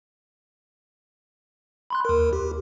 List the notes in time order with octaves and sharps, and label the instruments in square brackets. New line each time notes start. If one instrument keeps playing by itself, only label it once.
[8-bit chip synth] B5 C6 F#6
D#2 A#4
G4